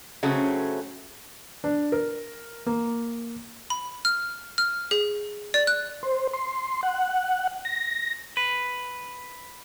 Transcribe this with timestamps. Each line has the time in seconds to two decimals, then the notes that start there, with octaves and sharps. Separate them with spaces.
0.23 C#3 F#3 A3 C4 C#4
1.64 D4
1.92 A#4
2.67 A#3
3.70 B5
4.05 F6
4.58 F6
4.91 G#4
5.54 D5
5.67 F#6
6.03 C5
6.34 C6
6.83 F#5
7.65 A#6
8.37 B4